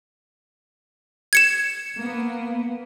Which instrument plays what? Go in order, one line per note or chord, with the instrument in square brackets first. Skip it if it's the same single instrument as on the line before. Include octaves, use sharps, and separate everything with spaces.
[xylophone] G#6 C#7 E7
[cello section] A#3 B3